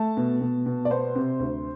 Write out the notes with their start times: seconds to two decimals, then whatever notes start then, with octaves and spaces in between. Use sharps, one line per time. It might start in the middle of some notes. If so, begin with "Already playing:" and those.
Already playing: A3 A5
0.17 B2
0.41 B2
0.66 B2
0.85 D5
0.91 B3 C5
1.15 C3
1.40 D2